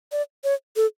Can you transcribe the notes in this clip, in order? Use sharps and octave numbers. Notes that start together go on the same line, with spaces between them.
D5
C#5
A4